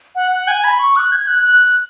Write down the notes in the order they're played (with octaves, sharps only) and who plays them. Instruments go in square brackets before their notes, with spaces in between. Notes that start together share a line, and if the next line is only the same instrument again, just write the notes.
[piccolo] F#5
F#5
G#5
B5
C#6
F#6
G#6
F#6
F#6